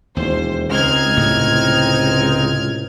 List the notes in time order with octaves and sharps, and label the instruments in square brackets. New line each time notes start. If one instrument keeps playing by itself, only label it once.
[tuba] E1 [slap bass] D#2 [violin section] C5
[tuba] C#2 [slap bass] G#3 [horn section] C4 D#4 [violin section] F6 G#6
[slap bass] A2 C3 A3